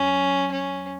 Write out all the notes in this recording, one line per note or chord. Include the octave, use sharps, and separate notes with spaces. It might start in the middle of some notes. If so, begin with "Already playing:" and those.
Already playing: E2 F#3 C#4
C#4